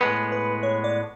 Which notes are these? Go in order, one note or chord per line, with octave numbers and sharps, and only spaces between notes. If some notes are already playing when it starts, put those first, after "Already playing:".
A2 G#3 B3 B4
B4
C#5
D5